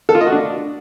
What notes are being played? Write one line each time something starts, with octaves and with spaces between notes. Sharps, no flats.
A4
F4
D#5
F#4
D4